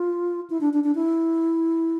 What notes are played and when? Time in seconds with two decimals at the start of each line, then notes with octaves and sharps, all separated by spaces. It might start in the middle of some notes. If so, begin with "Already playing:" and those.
Already playing: F4
0.50 E4
0.61 D4
0.73 D4
0.84 D4
0.95 E4